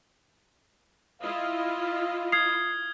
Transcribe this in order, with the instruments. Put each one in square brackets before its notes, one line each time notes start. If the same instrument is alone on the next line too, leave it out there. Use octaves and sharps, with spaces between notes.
[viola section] E4 F4 D#5 [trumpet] F5
[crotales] D#6 F6 G#6 [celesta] C7